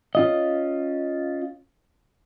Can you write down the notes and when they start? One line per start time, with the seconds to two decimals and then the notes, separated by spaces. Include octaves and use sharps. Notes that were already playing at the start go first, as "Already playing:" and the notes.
0.15 C#4 F4 D#5